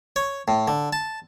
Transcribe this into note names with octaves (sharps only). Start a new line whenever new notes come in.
C#5
A2
D3
A5